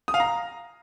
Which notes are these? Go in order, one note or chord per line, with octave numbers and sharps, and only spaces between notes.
D#6
F5
A#5